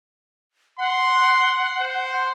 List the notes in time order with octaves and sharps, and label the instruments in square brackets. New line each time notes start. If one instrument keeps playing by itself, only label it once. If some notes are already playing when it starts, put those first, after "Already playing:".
[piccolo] F#5 [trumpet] C6
[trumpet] C5